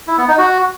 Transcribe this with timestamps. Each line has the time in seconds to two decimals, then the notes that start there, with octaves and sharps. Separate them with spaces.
0.08 E4
0.18 B3
0.28 D#4
0.38 F#4